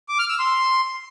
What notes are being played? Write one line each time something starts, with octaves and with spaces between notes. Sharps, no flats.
D6
F6
E6
C6